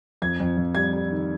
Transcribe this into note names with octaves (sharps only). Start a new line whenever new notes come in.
F2 G#6
F2
F2
G3 G#6
G3
D#3